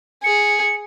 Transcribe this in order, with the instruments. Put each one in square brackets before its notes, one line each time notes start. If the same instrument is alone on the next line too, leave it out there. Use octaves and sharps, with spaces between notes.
[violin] G#4 [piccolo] C#7